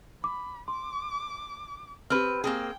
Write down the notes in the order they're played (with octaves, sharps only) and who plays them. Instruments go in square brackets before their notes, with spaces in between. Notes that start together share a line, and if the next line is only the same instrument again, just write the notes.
[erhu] B5 [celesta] D6
[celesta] C6 [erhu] D6
[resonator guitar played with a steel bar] C4 B4 [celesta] G4 B5 F6
[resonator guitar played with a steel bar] A#3 C4 G#4 [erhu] G5